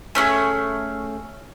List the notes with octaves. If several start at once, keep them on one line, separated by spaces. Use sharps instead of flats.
A3 C#4 D4 G#4